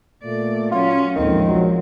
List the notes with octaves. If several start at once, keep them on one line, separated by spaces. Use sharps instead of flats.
A#2 A3 D5
F#3 C#4 F4
A#1 D#2 A2 D#3 F3 G#3 C4
A#1 A#2 F#3